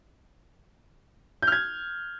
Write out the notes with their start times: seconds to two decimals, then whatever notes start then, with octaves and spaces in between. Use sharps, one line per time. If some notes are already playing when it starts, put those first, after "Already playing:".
1.42 G6
1.47 F6
1.52 G#6